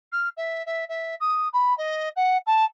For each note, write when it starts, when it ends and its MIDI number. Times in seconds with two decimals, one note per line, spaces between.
0.12 0.29 89
0.37 0.65 76
0.66 0.84 76
0.89 1.15 76
1.20 1.48 87
1.53 1.76 83
1.77 2.09 75
2.16 2.37 78
2.46 2.65 81